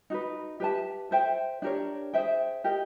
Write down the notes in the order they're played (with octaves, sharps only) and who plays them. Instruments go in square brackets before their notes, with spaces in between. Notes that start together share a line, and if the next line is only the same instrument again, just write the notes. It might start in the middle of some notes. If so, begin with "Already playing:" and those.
[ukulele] D#4 F#4 B4
G4 B4 E5 A5
A4 C5 E5 G5
D4 G4 A#4 C#5
G#4 C5 E5 G5
G4 A#4 D#5